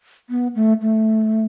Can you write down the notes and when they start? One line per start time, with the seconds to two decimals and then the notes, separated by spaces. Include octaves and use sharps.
0.30 B3
0.55 A3
0.81 A3